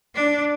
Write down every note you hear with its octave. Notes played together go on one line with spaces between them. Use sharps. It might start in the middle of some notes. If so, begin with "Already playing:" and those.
D4